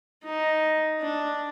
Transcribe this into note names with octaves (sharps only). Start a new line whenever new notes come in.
D#4
D4